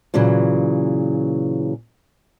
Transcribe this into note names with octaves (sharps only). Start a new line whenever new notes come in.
A#2 C#3 E3 F#3